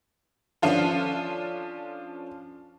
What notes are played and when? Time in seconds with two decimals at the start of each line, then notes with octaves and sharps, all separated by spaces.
0.62 F3 C#4 D4 F4 A4